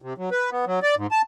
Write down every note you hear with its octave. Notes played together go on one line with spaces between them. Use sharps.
C3
F#3
B4
B3
F#3
D5
G#2
A5